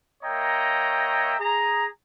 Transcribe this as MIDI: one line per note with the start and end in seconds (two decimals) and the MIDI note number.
0.23 1.35 58
0.23 1.35 73
0.23 1.35 75
0.23 1.35 76
0.23 1.35 79
0.23 1.35 82
1.39 1.87 68
1.39 1.87 82